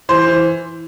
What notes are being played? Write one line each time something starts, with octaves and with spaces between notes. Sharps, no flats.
E3 C5
E3